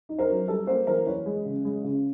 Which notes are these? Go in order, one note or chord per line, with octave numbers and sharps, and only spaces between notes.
D#4
A#4 C5
F#3
G3 A4 B4
A#3 A#4 C5
E3 A#4 C5
E3 B4 C#5
G#3
C#3
G#3
C#3